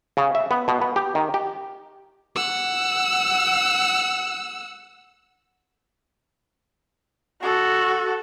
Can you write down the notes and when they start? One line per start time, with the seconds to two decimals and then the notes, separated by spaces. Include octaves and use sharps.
0.17 C#3
0.35 E5
0.51 B3
0.68 B2
0.82 B3
0.96 G4
1.15 D#3
1.34 G4
2.36 F#5 E6
7.43 F#4 A4